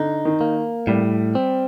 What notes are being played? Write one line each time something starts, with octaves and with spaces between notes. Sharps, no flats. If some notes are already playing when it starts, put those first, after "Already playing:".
Already playing: D3 D#4
D#3
A#3
A2 G3
C4